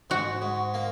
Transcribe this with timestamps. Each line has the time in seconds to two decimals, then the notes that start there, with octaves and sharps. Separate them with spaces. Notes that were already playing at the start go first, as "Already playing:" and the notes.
0.10 G#2 F#4
0.42 G#2
0.74 A#3